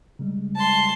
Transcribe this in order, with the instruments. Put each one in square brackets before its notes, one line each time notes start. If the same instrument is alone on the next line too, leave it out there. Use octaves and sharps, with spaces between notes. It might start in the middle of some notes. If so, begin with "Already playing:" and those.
[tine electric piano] C#3 G3 G#3
[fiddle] A5 C6